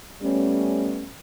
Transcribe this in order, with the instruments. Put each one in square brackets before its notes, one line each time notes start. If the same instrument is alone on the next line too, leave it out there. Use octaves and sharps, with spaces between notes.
[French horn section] G3 A3 B3 C#4